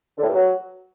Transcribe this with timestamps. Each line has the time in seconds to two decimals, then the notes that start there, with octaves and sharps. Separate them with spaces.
0.18 D3
0.23 A2
0.29 G2
0.34 F#3